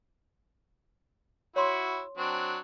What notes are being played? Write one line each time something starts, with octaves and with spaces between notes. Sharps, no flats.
E4 F#4 C#5 C6
F#3 C4 D4